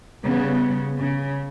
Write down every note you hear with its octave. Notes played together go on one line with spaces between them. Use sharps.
C#3 G3 B3
C#3